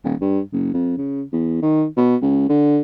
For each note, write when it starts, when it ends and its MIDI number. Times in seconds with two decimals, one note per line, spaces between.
0.04 0.15 27
0.21 0.40 43
0.52 0.69 30
0.74 0.96 41
0.97 1.22 49
1.33 1.60 40
1.62 1.85 51
1.97 2.16 47
2.22 2.49 37
2.49 2.81 50